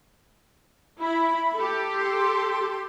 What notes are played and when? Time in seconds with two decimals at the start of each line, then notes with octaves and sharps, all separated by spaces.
1.00 E4 E5 B5
1.55 G4 A4
1.94 C6